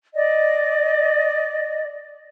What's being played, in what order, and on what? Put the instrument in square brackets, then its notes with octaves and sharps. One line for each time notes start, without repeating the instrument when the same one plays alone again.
[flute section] D5 D#5